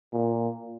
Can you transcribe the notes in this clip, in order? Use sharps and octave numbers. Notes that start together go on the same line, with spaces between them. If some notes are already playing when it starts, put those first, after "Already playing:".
A#2